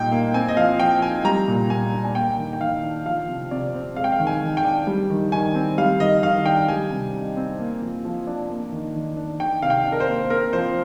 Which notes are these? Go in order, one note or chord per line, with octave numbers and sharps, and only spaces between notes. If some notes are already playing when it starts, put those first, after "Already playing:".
Already playing: A#2 G3 D#4 G5
A#3
C4 G#5
D#5
F3 F5
F3 G5
D#4 G#5
G3 A#5
A#2
A#2 G#5
D4
G#5
A#3 G5
D#3
G5
D#3 F5
D4
F3 F5
C3
C3 D5
C4
G#3 F5
G5
F5
D#3
G#5
D#3
G5
D4
G3
D#3
D#3 G#5
C4
G3 F5
D#3 D#5
D#3 F5
D4 G5
G3 G#5
C3
D#4
C4
A#3
F3
F3
D4
A#3
D#3
D#3
D4
D#3 G5
C3 F5
G5
D4
A#4
C5
A#3
C4 A#4
F3 C5